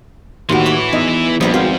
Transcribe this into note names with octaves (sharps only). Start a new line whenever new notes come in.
D#2 A2 D#3 E3 E4 F#4 C6
B4 C#5 D5
E2 G#3 D#4 D#5 E5
A#1 F2 G3 B3 E4 A#4 D#6
G#1 F#4 C5 F5 G#5